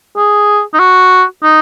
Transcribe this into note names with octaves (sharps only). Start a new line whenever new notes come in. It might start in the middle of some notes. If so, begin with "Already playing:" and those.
G#4
D#4
F#4
D#4